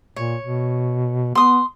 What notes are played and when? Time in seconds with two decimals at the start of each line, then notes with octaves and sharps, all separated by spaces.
0.16 A#2 C#5
0.42 B2
1.35 B3 C6 D#6